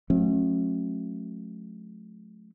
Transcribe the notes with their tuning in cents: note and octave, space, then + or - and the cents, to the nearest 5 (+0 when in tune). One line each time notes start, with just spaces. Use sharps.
F#3 -45 A3 -30 C#4 -35